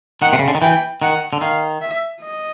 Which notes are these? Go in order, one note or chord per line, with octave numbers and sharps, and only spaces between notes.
D#3 F#5
C3
C#3
D3
D#3
E3 G5
D#3 F#5
D3
D#3 F5
E5
D#5